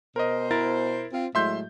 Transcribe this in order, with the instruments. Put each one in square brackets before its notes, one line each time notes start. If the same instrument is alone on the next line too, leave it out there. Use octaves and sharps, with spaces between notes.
[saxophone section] B2 C5 [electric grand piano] A#4 D#5
[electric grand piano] E4 A#4 A6
[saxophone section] C4 F4
[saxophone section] A2 F#3 G#3 [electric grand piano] E5 C6 G6